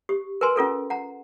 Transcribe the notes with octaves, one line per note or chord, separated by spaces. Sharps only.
G4
A#4 B4 G#5 C6
C#4 F4 A4 A#4
F#5 A#5